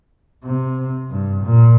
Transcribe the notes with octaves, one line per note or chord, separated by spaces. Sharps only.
C3
G2
A#2